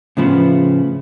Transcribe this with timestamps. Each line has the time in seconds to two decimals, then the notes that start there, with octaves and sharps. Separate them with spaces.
0.17 A2 C#3 F3 B3